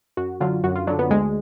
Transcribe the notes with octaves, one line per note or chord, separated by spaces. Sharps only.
F#2 F#4
D3 F#3 F4
F#2 F#4
F4
D3 F#3 D4
B3
D2 G#3